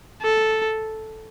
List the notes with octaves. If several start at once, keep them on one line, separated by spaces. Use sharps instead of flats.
A4